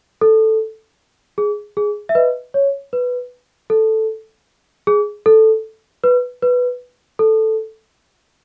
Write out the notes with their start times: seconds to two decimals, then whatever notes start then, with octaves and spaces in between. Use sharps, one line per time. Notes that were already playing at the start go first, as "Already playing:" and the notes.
0.21 A4
1.38 G#4
1.77 G#4
2.09 E5
2.15 B4 D#5
2.54 C#5
2.93 B4
3.70 A4
4.87 G#4
5.26 A4
6.04 B4
6.42 B4
7.19 A4